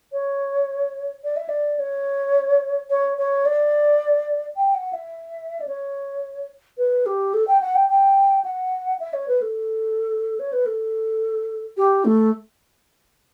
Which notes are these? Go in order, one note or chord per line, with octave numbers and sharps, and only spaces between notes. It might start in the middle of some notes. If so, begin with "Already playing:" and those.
C#5
D5
E5
D5
C#5
C#5
C#5
D5
G5
F#5
E5
D5
C#5
B4
G4
A4
G5
F#5
G5
G5
F#5
E5
C#5
B4
A4
C#5
B4
A4
G4
A3